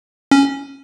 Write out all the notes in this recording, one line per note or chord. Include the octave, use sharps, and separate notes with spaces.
C#4